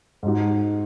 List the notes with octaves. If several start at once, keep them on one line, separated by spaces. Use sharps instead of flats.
G#2 G#3 D#4 F#4